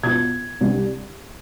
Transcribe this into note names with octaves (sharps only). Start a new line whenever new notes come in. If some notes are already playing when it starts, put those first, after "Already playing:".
B2 B3 F4 G#6
C2 C3 G3 D4